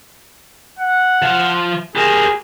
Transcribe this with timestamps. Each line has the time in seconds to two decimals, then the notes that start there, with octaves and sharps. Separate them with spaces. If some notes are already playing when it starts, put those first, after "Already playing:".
0.79 F#5
1.22 F3 F5
1.96 G4 G#4 A#4